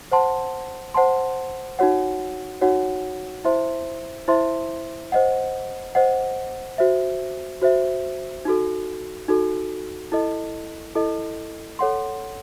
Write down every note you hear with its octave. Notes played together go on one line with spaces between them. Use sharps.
C5 F#5 A5 C6
C5 F#5 A5 C6
D#4 F#4 C#5 F#5
D#4 F#4 C#5 F#5
E4 C5 E5 C6
E4 C5 E5 C6
C5 D#5 F#5
C5 D#5 F#5
F#4 C5 E5
F#4 C5 E5
D#4 F#4 A4
D#4 F#4 A4
E4 A4 D#5
E4 A4 D#5
A4 C#5 F#5 C6